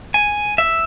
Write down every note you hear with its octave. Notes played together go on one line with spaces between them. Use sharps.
G#5
E5